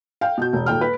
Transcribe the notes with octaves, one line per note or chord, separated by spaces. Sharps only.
F5 G5
B2 G6
E1
D#1 G5 F6
B4